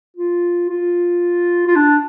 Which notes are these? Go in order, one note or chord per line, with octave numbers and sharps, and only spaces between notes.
F4
F4
F4
D4